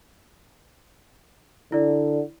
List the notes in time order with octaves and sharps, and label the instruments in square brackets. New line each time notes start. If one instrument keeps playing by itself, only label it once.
[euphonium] D3 [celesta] E4 D5